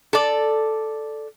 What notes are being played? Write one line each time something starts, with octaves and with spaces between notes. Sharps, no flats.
A4 D5